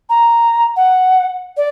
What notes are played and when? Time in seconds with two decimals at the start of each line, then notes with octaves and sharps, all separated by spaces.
0.10 A#5
0.76 F#5
1.57 D5